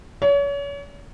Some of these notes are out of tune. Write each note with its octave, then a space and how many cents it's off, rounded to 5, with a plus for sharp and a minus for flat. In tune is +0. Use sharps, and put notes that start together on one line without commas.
C#5 +35